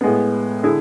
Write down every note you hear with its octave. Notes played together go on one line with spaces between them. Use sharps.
A2 G#3 B3
D3 E4 G#4